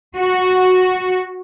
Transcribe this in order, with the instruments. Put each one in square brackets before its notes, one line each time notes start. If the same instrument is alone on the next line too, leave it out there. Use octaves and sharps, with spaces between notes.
[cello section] F#4